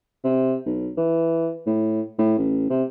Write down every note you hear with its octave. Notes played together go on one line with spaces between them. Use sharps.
C3
B1
E3
A2
A2
A1
C3